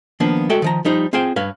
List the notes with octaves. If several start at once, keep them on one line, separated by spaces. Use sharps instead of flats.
D#3 F3 A#3 B3 D4
G#3 F#4 A4 D5 E5 G5
D#3 F3 A#5
F3 G3 D#4 C5
C4 F4 G#4 C5 G5
G2 B4 C#5 F5